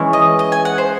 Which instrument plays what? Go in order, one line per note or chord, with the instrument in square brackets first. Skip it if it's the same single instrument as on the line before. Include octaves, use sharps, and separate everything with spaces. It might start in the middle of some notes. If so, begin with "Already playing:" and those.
Already playing: [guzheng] E3 G#3 C#4 E4
[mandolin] D#5
D#5
G#5
F#5
C5